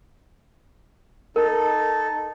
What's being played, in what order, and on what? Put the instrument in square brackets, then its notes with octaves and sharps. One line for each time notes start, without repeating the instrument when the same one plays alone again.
[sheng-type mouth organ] D#4 A4 [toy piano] A#4